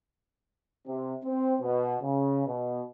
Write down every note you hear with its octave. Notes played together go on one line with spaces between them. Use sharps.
C3
C4
B2
C#3
B2